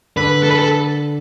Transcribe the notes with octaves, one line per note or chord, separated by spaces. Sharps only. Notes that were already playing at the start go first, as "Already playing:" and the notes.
D3 B4
A4
B4
A4